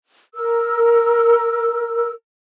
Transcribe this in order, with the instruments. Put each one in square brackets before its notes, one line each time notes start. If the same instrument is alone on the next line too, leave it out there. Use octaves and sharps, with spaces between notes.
[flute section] A#4 E6